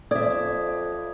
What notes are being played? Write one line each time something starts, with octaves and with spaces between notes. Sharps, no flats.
F2 D5 E5 D#6 G#6